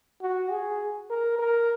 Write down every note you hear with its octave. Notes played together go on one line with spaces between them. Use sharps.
F#4
G#4
A#4
A#4